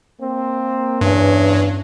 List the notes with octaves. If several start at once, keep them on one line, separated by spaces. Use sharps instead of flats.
A#3 C4
E2 G2 C#4